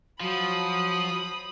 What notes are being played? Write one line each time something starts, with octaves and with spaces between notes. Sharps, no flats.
F3 F#3 B5 D#6